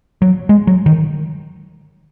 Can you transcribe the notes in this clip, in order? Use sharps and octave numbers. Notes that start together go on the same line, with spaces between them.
F#3
G#3
F#3
D#3